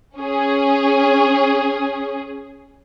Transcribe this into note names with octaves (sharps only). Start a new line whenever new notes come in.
C#4 G#4